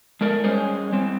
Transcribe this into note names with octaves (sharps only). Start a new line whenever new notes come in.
G#3 A3 A#4 D5
G3 G#3 C#4 G#4 C5
G3 C4